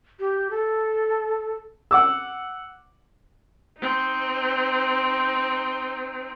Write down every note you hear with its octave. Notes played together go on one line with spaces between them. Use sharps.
G4
A4
F#5 D6 E6
C4 D#4